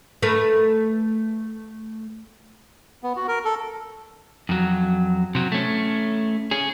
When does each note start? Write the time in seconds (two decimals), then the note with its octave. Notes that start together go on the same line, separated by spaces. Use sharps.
0.22 A3 A#4 B4
3.03 B3
3.16 F#4
3.28 A#4
3.45 A4
4.49 F2 F#3
5.35 C3 F#3
5.52 A3 C#4
6.51 C#4 G#4